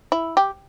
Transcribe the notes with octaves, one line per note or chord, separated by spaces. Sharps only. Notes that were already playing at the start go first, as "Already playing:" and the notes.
E4
G4